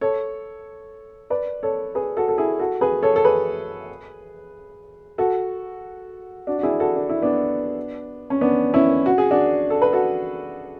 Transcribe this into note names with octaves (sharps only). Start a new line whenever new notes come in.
A4 C#5
B4 D5
A4 C#5
G#4 B4
F#4 A4
A4
E4 G#4
F#4 A4
G#4 B4
A4 C#5
A4
G#4 B4
F#4 A4
D4 F#4
F#4
E4 G#4
F#4 A4
D4
E4
B3 D4
C#4
B3 D4
C#4 E4
F#4
G#4
D4 F#4
A4
B4
F#4 A4